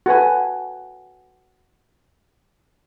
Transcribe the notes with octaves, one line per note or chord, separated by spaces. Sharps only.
F#4 A4 B4 G#5